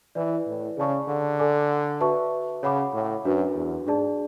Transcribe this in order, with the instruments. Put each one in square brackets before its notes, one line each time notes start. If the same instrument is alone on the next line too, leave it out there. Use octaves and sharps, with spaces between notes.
[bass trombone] E3 [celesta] E4 B4 D5
[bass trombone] A2
[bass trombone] C#3 [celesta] G#4 D5 A5 C#6
[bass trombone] D3
[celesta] A4 D5 G#5 D6
F#4 B4 E5 A5 C#6
[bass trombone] C#3 [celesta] C#5 F#5 B5 D6
[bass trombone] A2
[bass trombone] F#2 [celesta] D4 F#4 B4
[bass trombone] E2
[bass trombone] G#2 [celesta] D4 G#4 D5 A5